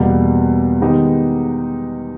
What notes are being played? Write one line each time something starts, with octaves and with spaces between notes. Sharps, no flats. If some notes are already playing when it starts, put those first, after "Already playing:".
Already playing: E2 B2 G3 A#3
D#3 G#3 B3 D#4 G4